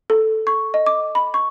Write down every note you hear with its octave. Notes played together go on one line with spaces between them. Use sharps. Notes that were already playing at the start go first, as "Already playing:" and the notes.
A4
C#6
D#5
D6
B5
C#6